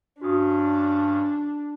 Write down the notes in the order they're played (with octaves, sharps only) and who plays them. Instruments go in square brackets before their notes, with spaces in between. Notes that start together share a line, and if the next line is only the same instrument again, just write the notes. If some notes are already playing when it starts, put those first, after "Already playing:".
[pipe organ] G2 C#4 [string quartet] D4 [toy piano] F#4 D#6